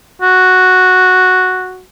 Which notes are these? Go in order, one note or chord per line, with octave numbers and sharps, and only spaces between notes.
F#4